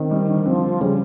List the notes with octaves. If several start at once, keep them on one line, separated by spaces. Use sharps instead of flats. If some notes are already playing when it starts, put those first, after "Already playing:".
Already playing: D#3 C4
G3
D3
F3 C4
F4
C#3 G3